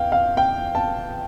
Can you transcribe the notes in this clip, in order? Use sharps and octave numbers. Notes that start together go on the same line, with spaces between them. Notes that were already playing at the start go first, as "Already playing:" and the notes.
Already playing: E2 F5 G5
F5
G5
A5